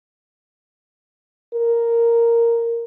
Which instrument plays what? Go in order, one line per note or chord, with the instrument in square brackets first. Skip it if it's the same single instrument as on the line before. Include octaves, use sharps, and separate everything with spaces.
[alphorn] A#4